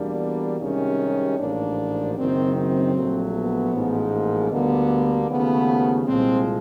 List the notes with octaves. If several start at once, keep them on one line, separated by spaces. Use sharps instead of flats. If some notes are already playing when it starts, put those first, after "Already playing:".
Already playing: E2 B2 G3 A#3 D4
C2 C3 D#3 G#3 C#4
A1 G#2 F3 A#3 D4
F#1 F#2 D#3 C4
C4
A#1 A#2 F#3 A3
B3
A1 G#2 F3 G#3
A#3
D2 D3 G3 A#3 B3
D#2 C#3 F3 A3 B3
C2 A#2 F3 G#3 C4